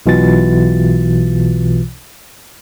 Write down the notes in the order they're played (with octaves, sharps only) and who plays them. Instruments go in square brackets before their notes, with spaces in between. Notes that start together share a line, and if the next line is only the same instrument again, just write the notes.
[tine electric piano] B1 B2 E3 F4 A6